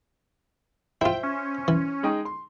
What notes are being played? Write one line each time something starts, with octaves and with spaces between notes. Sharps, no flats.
E4 F4 C5 E5 G5
C#4
E3
G#3 D#4 G5
C6